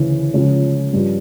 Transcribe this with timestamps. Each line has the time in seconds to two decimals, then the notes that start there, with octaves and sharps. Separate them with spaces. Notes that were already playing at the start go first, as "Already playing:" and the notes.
Already playing: D2 C#3 E3
0.34 C#2 C#3 F3 C#4
0.93 G2 F3